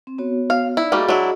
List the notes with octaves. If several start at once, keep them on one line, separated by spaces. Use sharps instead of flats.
C4
B3 F#4 C#5
F5
D#4 E4 D5
G3 A3 A#3 F#4 G#4 D#5
F#3 D4 E4